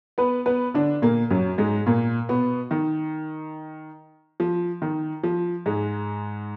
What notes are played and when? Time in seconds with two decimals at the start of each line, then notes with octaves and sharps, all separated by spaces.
0.18 B3 B4
0.46 B3 B4
0.74 D3 D4
1.02 A#2 A#3
1.30 F#2 F#3
1.58 G#2 G#3
1.86 A#2 A#3
2.29 B2 B3
2.71 D#3
4.40 F3
4.82 D#3
5.23 F3
5.66 G#2 G#3